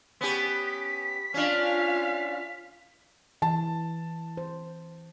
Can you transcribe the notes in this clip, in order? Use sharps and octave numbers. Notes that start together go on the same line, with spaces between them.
B3 C#4 G4 B6
C#4 D4 F4 F5
E3 A5
C5